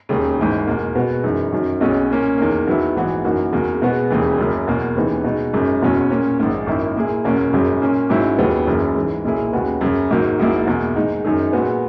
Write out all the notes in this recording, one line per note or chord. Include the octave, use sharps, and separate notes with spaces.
E1 D#2 C#3
G#1 G#2 E3
E2 B2 A#3
B2 G#3 B3 F#4
F#2 E3 G#3 D#4
F#2 D#3 F#3
B1 B2 G#3 C#4
A#2 A#3 C#4
E2 D#3 A#3
E2 D#3 F#3 B3 E4
A#1 G#2 E3 B3 F#4
F#2 E3 A#3 D#4 F#4
E2 C#3 F#3 A#3
B2 G#3 B3 F#4
E1 D#2 C#3 E3
F#1 F#2 C#3
E2 B2 A#3
D#2 C#3 E3 B3 D#4
B2 G#3 D#4
G#1 F#2 C#3
F#1 E2 B2 F#3 C#4
A#2 A#3 C#4
A#1 G#2 D#3
G#1 F#2 D#3 A#3 E4
A#2 A#3 E4 G#4
F#1 E2 B2 A#3 C#4
G#1 F#2 C#3 F#3
A#2 A#3 C#4
G#1 G#2 F#3 C#4 E4
D#2 C#3 F#3 B3
F#1 F#2 C#3 E3
G#2 E3 G#3
B1 A#2 A#3 E4 G#4
D#2 C#3 G#3 B3 F#4
F#2 C#3 F#3
G#1 G#2 D#3 F#3 A#3
A#1 G#2 F#3 A#3 E4
E2 B2 A#3 E4
G#2 D#3 G#3 D#4
F#2 D#3 G#3 D#4 G#4
A#2 G#3 B3 F#4